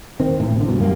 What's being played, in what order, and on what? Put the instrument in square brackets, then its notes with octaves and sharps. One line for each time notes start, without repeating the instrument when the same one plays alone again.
[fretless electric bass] D#3 C4
A1 A2
B2 D3
G2 B2
F#2 G3 A#3